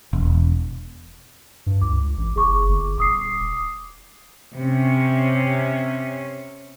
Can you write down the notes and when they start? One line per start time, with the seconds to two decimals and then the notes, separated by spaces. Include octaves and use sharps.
0.13 E1
1.66 G2
1.82 C#2 D6
2.18 A1
2.36 F#1 G#4 C#6 D6
2.69 G1
2.98 D#1 D6 D#6 C7
4.58 C3 C#4